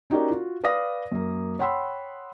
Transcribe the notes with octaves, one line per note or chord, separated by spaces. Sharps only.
C#4 D#4 F#4 G4 A#4 D5
F4 F#4
B4 D5 F5 D#6 A#6
F#2 A#3
C#5 F#5 G5 B5 C6 E6